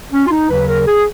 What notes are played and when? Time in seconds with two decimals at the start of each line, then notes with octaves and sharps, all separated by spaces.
0.13 C#4
0.26 F4
0.31 D#4
0.49 D#2 C#3 F#3 B4
0.69 A#4
0.87 G#4